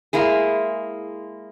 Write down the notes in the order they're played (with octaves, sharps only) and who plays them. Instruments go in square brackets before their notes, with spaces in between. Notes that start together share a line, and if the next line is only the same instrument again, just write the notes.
[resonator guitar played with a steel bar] G#3 A#3 E4 G#4